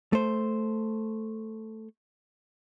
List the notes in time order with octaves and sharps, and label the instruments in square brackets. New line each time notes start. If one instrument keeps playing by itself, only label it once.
[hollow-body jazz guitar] A3 C5